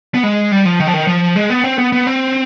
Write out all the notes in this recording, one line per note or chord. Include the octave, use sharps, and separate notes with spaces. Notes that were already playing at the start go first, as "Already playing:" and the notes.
B3
G#3
G3
F3
D#3
F3
D#3
F3
G#3
B3
C4
B3
B3
C4